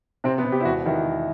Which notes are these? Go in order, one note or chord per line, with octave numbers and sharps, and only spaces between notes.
C3 C4
B3
C3
G4
E4
E1 F#4
D#3 E4